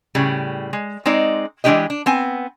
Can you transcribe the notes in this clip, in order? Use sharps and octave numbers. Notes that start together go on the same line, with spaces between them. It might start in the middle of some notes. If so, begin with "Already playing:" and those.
A2 C#3 G3
G#3
G#3 C4 D#4 D5
E3 G#3 A#3 D4 G4 D#5
D4
B3 C4 G#5